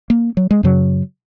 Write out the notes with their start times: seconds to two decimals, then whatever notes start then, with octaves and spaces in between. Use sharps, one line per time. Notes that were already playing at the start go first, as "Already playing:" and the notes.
0.10 A#3
0.37 F#3
0.51 G#3
0.63 F#2 C#3 F#3